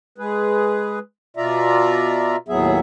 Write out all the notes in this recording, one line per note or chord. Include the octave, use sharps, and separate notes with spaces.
G#3 G#4 B4
B2 F4 D5 E5 A#5
D#2 A2 F#3 B3 G#4 E5